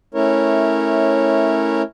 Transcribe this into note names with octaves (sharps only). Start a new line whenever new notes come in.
A3 C#4 E4 A#4 C#5